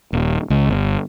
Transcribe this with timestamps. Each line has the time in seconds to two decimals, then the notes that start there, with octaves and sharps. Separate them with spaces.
0.13 D#1
0.50 C#2
0.69 G1